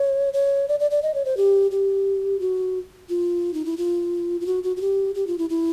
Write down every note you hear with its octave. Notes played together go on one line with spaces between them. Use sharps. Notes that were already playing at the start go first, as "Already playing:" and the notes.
Already playing: C#5
C#5
D5
D5
D5
D#5
C#5
C5
G4
G4
F#4
F4
D#4
E4
F4
F4
F#4
F#4
F#4
G4
G4
F4
E4
E4